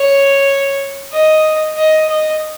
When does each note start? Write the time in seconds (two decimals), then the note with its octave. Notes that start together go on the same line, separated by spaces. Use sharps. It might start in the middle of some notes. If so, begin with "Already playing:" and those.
Already playing: C#5
1.13 D#5
1.77 D#5
2.09 D#5